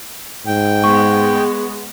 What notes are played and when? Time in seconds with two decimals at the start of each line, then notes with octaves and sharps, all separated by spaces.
0.47 G#2 G5
0.84 G#3 B3 C#6